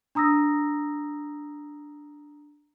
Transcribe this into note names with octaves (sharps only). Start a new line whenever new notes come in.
D4 A#5 D#6 E6 A#6